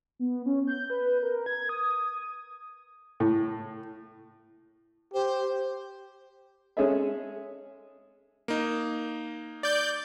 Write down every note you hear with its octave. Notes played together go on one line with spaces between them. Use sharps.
B3
C#4
G6
B4
A#4
G#6
D#6
A2
G4 C5
G#3 C#4 G#4 A4 D#5 E5
A#3 D#4
D5 G6